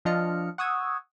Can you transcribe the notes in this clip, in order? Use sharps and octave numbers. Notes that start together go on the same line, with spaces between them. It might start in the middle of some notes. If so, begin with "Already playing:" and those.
F3 D4 F4 D#5 F6 C#7
F#5 C#6 D#6 E6 G#6